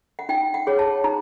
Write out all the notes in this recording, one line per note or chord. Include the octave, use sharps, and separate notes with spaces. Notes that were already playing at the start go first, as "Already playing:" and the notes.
F#5
D#4 G5
F#5
G#4 C#5
A5
D#4 A#5